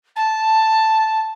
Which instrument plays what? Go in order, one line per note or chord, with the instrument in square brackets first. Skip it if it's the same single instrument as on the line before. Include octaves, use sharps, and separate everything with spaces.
[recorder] A5